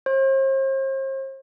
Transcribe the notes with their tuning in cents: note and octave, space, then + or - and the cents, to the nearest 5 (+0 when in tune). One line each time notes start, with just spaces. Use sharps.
C5 +40